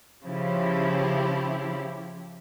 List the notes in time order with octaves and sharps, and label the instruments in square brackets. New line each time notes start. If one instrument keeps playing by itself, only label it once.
[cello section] C#3 F3 E4 G4